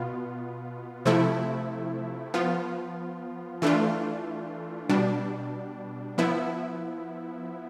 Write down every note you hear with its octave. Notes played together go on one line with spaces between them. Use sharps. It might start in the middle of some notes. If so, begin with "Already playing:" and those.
Already playing: B2 B3 F4
C3 F3 A3 E4
F3 B3 F4
E3 A3 D4 F4
B2 G3 D4
F3 B3 E4